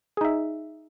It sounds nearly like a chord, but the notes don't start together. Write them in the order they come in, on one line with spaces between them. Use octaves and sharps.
G#4 D#4 E5